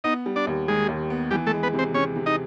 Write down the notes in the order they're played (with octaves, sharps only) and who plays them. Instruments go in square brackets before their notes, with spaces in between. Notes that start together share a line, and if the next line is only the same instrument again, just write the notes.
[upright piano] B3 [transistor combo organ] D#4 D#5
[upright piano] G3
[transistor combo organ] D4 D5
[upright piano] D#2
[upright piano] D#3 [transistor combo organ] G#3 G#4
[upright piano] D#2
B3
[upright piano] E3 [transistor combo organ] G3 G4
[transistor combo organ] A3 A4
[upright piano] G#3
[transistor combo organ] B3 B4
[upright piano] C3
[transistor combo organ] C4 C5
[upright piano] C3 [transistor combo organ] C#4 C#5
[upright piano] C3
[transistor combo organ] D#4 D#5